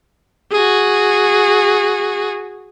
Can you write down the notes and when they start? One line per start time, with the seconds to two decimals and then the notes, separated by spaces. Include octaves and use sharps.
0.52 F#4 G#4